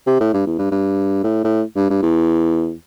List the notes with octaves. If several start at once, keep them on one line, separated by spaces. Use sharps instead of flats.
C3
A2
G2
E2
G2
G2
A2
A2
G2
G2
E2